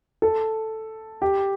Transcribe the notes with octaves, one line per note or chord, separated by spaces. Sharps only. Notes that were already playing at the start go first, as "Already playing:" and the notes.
A4
G4